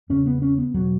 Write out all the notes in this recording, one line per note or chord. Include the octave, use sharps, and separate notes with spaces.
E2 C#3 C#4
B3
C#4
B3
E2 B2 F#3